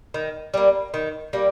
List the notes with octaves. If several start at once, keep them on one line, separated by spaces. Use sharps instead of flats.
D#3
G3 A#3
D#3
G3 A#3